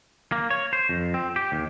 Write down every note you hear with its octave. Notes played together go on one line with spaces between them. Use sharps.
A#3
C#5
C5
F2
C4
G4
D#2